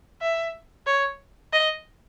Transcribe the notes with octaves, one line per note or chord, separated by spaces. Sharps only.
E5
C#5
D#5